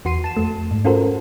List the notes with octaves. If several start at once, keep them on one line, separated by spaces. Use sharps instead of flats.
E2 F#4 C6 C7 D#7
A5 E7
F2 A3
G#2
C#4 F4 F#4 A4 A#4 C5